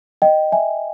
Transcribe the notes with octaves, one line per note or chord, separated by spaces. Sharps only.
D#5 G5
E5 G#5